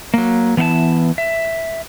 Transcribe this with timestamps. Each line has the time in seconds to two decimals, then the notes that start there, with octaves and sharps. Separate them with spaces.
0.14 F#3 A#3
0.57 E3 B3 E4 F#5 A5
1.18 E5